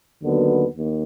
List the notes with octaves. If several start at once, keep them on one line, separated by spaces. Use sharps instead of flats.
D#2 D3 F#3 B3
D#2